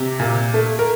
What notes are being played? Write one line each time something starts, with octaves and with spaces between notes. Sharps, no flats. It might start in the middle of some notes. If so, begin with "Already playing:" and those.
Already playing: C3 G4
A#2
A3
A#4